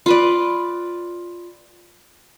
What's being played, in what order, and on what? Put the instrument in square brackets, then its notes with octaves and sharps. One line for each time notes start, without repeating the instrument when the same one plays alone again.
[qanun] F4 B4 D5